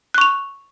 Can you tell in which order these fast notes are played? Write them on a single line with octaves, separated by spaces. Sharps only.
F#6 C#6 F7